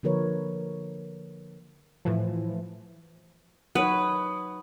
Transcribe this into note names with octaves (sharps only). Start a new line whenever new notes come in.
D3 F3 A#3 A#4 B4 C#5
A2 E3 F3
F#3 D#4 B4 C#5 F#5 D#6